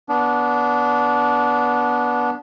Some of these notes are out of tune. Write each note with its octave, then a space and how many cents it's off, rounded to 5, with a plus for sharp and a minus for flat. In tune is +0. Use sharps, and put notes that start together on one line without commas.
B3 -20 D4 -20